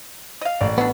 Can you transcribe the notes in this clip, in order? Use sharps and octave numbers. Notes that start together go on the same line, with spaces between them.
D#5 F5
A1 D5
F#3 B3 D4